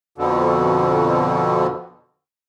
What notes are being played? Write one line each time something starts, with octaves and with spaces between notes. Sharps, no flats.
F2 B2 D3